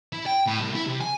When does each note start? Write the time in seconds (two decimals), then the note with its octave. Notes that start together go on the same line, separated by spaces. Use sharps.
0.13 E4
0.26 G5
0.46 A2
0.60 C2
0.75 E4
0.87 C3
1.01 G#5